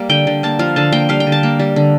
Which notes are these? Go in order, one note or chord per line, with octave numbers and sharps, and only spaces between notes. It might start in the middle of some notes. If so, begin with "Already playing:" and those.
Already playing: G3 A#3
D3 G5
D3
A#3 A5
F3 F5
D3 A5
A#3 G5
G3 F5
G5
D3
A5
A#3
G3
D3